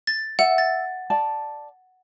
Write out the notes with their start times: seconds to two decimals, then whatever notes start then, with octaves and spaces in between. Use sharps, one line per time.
0.07 A6
0.39 E5 F#5
0.58 A6
1.10 D5 A5